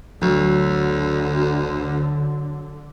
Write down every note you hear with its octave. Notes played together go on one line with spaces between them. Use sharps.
D2 D3 F#3